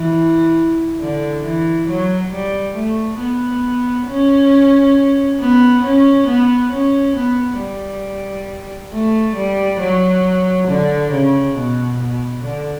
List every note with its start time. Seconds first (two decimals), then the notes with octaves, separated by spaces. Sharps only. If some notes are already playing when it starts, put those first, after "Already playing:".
Already playing: E3
1.01 D3
1.45 E3
1.89 F#3
2.33 G3
2.76 A3
3.20 B3
4.09 C#4
5.40 B3
5.84 C#4
6.28 B3
6.73 C#4
7.16 B3
7.60 G3
8.93 A3
9.35 G3
9.80 F#3
10.68 D3
11.12 C#3
11.56 B2
11.99 B2
12.44 D3